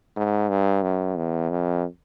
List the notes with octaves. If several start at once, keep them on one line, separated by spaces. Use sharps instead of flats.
G#2
G2
F#2
E2
F2